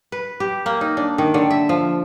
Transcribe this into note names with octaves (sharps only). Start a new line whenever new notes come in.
B4
G4
A#3
D#4
D4
D#3
D3
E5
F3